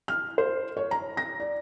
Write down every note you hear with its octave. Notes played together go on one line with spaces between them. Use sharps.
F6
C5
C#5
A#5
A#6
D5